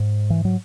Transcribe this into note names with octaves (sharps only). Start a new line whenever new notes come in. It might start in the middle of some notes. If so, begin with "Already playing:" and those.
Already playing: G#2
E3
F#3